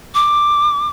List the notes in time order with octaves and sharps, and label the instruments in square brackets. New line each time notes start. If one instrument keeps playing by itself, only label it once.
[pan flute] D6